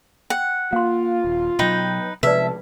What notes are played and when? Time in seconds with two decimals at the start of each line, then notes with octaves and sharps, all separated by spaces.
0.30 F#5 G5
0.73 A#3 F4 F5 C6
1.24 D#1
1.59 B2 F#3 D#4 B4 G5
2.23 B1 C3 F3 G#3 B4 D5 E5 A5